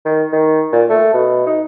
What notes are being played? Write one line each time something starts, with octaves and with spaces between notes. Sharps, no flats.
D#3
D#3
A#2
A3
B2
D#4